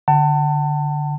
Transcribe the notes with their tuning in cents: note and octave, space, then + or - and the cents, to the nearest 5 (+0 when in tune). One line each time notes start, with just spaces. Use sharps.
D3 +0 F#5 +40 A5 +25